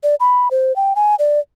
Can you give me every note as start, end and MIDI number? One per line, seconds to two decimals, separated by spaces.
0.03 0.15 74
0.20 0.48 83
0.51 0.75 72
0.76 0.94 79
0.96 1.15 80
1.19 1.40 74